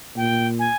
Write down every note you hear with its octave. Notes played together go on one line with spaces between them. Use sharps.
A#2 G5
G#5